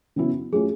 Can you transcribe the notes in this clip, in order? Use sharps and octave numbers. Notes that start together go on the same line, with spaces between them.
C#3 F#3 B3 E4
F#3 A3 C#4 F4 G#4